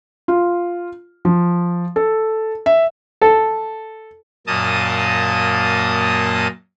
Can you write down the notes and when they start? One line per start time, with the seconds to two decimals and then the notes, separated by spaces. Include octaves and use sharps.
0.28 F4
1.25 F3
1.96 A4
2.66 E5
3.21 A4
4.47 F#2 A#2 A#3 D#5 A5 D#6